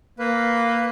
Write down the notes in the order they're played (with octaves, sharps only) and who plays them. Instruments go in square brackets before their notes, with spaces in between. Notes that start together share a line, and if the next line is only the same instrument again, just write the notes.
[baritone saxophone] A#3 [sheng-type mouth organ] B4